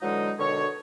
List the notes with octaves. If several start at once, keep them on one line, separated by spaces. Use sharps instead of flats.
D3 E3 F#3 G#3 D#4
B2 D3 D#3 C#5